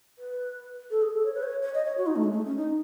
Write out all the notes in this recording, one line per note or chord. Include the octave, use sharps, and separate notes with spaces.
B4
A4
G#4
A4
C#5
B4
C#5
C#5
D#5
C#5
F#4
D#4
A3
G#3
A3
C#4
D#4